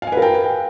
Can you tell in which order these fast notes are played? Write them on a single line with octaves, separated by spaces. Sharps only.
F5 G#5 B4 A#4 G5